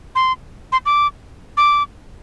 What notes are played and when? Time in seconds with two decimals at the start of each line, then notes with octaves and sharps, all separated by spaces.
0.15 C6
0.72 C6
0.86 D6
1.57 D6